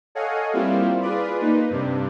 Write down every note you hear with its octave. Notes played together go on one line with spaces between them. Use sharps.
A4 C#5 D#5 F5 F#5 G#5
G3 A#3 C4 E4 F4
F4 G#4 B4 D5 B5
A#3 D#4 B4
G2 C3 D4